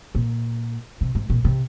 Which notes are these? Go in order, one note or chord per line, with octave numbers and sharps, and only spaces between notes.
A#2
C3
G#2
A#2
C3